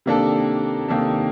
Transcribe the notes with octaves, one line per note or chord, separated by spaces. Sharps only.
C3 D#3 A#3 D4 A4
C3 D#3 A#3 D4 A4